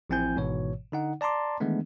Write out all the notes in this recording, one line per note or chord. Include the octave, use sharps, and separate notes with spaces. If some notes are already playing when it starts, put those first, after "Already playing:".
A1 F3 C4 E4 G#5 G6
G#1 G#2 B2 E3 C#5
D3 D#4 F#5
D5 A5 A#5 C6 D6
D#3 E3 G#3 A3 B3 D4